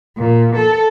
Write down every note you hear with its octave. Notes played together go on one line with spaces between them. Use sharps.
A#2
A4